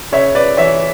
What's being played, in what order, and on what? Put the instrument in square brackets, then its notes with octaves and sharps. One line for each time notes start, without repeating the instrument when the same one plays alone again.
[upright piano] C#3 C#5 E5
B4 D5
E3 C#5 E5